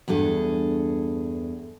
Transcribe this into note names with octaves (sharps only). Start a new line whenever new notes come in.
E2 G2 G#4 A4